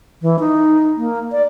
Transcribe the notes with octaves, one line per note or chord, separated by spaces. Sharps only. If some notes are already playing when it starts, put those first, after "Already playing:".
E3
D#4
A#3
D5